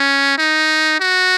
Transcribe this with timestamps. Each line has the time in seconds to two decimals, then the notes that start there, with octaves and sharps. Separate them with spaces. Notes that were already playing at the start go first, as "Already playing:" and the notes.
Already playing: C#4
0.38 D#4
1.00 F#4